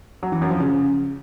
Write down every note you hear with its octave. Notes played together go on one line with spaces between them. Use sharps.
F#3
E3
F#2
F3
C#3